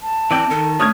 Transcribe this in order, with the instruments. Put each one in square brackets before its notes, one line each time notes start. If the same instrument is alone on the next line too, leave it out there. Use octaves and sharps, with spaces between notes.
[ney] A5
[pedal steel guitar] E3 D5 G5 [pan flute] C4
[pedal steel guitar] D#3 [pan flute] A4
[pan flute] A3 [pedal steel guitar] C#4 D4 C#5 [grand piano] D#6 F6 G#6